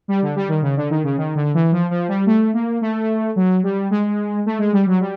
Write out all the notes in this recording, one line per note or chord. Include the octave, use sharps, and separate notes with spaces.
G3
D3
G3
D#3
C#3
D3
D#3
C#3
D#3
D3
E3
F3
F3
G3
A3
A#3
A3
F#3
G3
G#3
A3
G#3
G3
F#3
G3